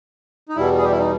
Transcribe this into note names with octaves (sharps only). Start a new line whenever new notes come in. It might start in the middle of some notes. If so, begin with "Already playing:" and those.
D#4
E2 B2 G3 E4
G#4
G4
E4
D#4